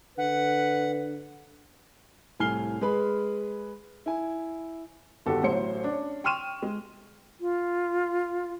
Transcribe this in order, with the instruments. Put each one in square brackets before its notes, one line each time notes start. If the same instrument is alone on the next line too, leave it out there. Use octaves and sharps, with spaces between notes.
[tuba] D3 [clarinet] B4 [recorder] F#5
[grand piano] C2 A2 G#5 F6 C7 G7
G#3 G#4 B4 B5
E4 G#5
[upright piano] G1 D#3 F#4 G4 A4
A1 A2 F#3 C5 C#7
C#4 D4
G5 C6 C#6 F6 D#7 E7
G#3
[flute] F4